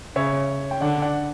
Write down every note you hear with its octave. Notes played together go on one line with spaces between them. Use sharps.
C#3 C#5 E5
G5
D3 D5 F#5
D5 F#5